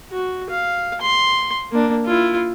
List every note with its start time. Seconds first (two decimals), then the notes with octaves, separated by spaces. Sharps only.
0.11 F#4
0.50 F5
1.01 C6
1.72 A#3 D4
2.05 E4 F4